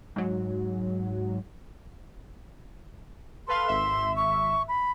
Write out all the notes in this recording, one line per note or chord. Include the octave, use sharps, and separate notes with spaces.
G#2 F#3
A4 B4 F5 C6
G#1 E5
C#6
B5